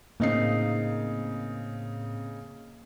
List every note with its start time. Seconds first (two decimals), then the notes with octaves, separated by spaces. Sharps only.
0.20 A2 C#3 A#3 C4 D#4 C7